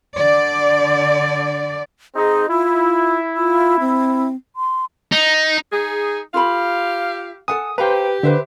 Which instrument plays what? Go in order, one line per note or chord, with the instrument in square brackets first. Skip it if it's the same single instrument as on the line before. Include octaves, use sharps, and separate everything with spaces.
[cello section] D3 D5
[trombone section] C4 D#4 [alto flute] G#4
[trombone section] E4 [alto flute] F4
[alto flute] F4
C4
C6
[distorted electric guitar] D#4
[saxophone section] D#4 G#4
[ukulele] F4 A4 B5 [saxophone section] G4 F5
[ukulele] A4 F#5 G#5 [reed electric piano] D#6
[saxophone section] G4 [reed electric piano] B4 G5 [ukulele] C5 F5 A#5
[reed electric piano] D3 [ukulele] B4 C5 E5